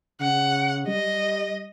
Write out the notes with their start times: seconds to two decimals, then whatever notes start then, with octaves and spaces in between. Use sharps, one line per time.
0.21 C#3 F#5
0.88 G3 D#5